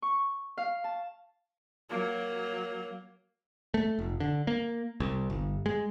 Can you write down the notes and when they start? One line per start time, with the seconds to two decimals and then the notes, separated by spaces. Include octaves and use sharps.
0.02 C#6
0.58 F5
0.84 A5
1.90 F#3 A#3
3.74 A3
3.99 F1
4.20 D3
4.47 A#3
5.00 C2
5.30 G1
5.66 G#3